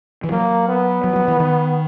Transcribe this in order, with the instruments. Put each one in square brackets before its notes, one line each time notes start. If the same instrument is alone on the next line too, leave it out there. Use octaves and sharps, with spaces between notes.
[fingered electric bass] E3
[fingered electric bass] F#3 [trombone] A#3
[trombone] B3
[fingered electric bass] F#3
F#3
E3
D#3